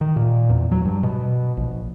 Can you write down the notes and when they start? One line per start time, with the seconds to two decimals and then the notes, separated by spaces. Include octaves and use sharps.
0.01 D#3
0.16 A#2
0.50 E2
0.71 F#3
0.85 G2
1.03 B2
1.57 A#1